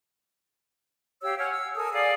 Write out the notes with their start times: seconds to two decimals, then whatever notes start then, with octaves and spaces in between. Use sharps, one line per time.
1.23 G4 C#5 F5 E6
1.39 C#5 F#5 G#5 F6
1.51 E6
1.75 A4 A#4 G#5 D#6
1.93 G#4 D5 F5 D#6